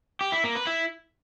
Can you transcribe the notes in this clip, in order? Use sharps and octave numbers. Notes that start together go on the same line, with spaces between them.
G4
E4
A#3
B4
E4